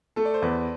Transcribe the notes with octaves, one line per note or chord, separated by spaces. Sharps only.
A3 A4
D5
C5
E2 B4